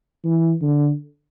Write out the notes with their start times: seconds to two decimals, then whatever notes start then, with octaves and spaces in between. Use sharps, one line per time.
0.24 E3
0.62 D3